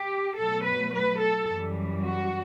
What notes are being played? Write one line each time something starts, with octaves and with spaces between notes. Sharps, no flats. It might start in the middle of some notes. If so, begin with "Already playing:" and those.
Already playing: G4
B2 F#3 A3 A4
B4
B4
A4
F#2 E3 G3
F#4